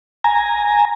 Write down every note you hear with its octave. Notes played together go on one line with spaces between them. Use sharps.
G#5 A#5